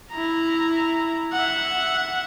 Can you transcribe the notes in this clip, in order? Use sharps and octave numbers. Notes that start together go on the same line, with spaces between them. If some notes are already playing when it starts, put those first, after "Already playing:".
E4 A#5
E5 F#5